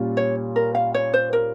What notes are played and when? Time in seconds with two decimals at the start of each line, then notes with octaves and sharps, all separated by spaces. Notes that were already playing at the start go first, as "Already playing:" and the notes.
Already playing: A#2 G3 C#4 F4
0.17 C#5
0.56 A#4
0.75 F5
0.94 C#5
1.14 C5
1.33 A#4